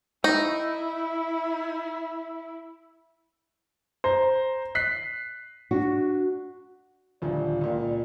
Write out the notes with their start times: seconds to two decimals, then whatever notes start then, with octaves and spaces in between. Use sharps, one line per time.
0.24 D#4 E4
4.04 C5 A#5
4.75 F#6 B6 C7
5.71 D4 F#4
7.22 D#1 D2 F3 D5
7.61 C#2 A#2